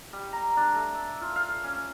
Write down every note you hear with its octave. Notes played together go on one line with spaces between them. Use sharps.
G3
A#5
D4
A3
E5
F4
F5
C#4